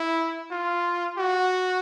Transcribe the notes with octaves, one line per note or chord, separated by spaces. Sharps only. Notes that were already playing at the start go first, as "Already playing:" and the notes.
Already playing: E4
F4
F#4